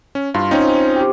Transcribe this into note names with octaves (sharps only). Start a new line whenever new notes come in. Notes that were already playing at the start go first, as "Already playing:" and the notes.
C#4
G2 F4
C4 C#4 D#4
G4